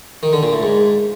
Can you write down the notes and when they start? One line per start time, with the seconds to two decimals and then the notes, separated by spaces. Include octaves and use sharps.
0.23 D#3
0.33 D3
0.43 A#2
0.53 A2
0.63 G#2